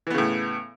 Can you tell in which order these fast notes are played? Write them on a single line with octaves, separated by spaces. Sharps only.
E3 B3 C#3 A2